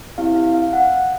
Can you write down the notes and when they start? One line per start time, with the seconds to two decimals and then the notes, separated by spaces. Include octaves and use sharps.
0.18 C4 E4 G4 F5
0.36 F5
0.54 F5
0.73 F#5